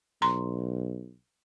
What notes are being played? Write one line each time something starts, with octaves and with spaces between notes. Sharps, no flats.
B1 A#5 C6